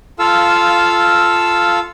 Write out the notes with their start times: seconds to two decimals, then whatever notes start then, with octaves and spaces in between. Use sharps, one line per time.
0.19 F4 A4 F5 E6